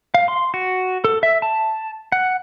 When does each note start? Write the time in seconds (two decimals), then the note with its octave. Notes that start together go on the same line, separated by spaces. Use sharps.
0.14 F5
0.28 C6
0.54 F#4
1.04 A4
1.23 E5
1.42 A5
2.12 F#5